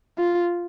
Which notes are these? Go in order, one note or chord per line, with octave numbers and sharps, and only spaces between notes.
F4